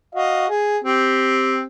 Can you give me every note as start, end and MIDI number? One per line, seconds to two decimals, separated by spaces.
0.15 0.47 66
0.15 0.47 75
0.15 0.47 77
0.49 0.78 68
0.84 1.63 60
0.84 1.63 67